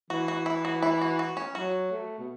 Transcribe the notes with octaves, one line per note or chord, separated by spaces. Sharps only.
E3 F#4
F#4
E4
F#4
E4
F#4
F#4
C#4
F#3 F#4
A3
B2